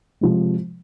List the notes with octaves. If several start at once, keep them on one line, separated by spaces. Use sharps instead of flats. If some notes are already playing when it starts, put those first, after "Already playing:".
C3 F3 G#3